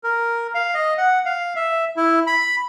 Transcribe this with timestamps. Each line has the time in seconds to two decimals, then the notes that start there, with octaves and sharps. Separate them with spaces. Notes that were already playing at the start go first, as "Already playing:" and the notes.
0.04 A#4
0.55 F5
0.74 D#5
0.98 F#5
1.25 F5
1.56 E5
1.97 E4
2.27 B5